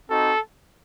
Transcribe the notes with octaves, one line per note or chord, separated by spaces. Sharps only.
C4 D#4 F#4 A4